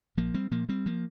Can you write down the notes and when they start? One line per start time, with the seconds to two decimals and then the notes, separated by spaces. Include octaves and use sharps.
0.17 A#1 F3 A#3
0.34 G3 C4
0.51 A#2 F3 A#3
0.69 G3 C4
0.86 F3 A#3